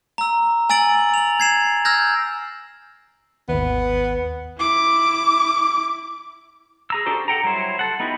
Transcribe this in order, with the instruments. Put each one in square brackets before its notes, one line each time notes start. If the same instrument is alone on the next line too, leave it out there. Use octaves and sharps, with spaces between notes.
[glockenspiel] A#5 E6
G#5 E6 A6 D7 F#7
F7 F#7
G#6 C7 E7
E6 F6 G6 G#6 A#6
[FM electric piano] G#1 D#2 [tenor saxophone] B3
[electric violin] E4 D6
[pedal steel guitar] G#4 A#5 E6
D4 F#4 G4 A4 C5
A4 F#5 G5 A#5
F#3 G3 E4 C5
A4 F#5
B3 D#4 E4 F#4 G4